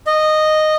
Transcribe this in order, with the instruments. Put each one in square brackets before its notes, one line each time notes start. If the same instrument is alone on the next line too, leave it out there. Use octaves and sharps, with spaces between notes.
[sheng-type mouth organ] D#5